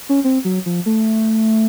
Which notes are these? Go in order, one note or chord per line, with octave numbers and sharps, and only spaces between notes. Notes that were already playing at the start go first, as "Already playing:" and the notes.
C#4
C4
F#3
F3
A3